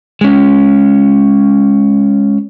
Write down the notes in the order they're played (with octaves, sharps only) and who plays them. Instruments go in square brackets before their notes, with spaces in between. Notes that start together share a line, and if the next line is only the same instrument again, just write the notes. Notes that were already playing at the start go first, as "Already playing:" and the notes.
[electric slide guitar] G#3 C#4